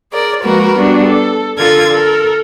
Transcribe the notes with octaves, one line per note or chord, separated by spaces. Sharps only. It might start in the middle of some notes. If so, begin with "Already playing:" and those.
G#4 A#4 D5
F3 G#3 A#3 F#4 A#4 B4
G3 B3 D4 F#4
A4
D3 F4 A4 A#4 G#6 A6
A4 A#4